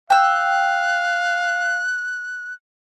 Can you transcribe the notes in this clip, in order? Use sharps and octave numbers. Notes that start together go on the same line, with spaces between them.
F5 G5 E6 F#6